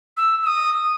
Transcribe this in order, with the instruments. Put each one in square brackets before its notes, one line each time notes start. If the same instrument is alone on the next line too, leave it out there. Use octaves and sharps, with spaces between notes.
[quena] E6
E6
D#6